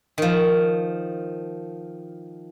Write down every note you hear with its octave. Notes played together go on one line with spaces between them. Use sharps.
D#3 F3